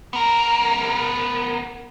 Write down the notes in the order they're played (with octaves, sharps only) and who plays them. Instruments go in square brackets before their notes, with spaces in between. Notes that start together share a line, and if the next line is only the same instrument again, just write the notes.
[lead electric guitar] B3 A#4